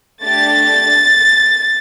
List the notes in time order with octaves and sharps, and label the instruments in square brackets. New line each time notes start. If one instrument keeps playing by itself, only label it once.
[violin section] A3 D4 G4 A6